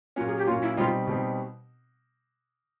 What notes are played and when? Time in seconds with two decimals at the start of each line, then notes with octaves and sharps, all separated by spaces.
0.16 A#2 F#3 A#3 C#4 F4
0.27 G#4
0.37 G4
0.46 A#2 F#3 A#3 C#4 F4
0.62 E4
0.77 B2 G3 C4 D#4 F4
1.07 B2 G3 C4 D#4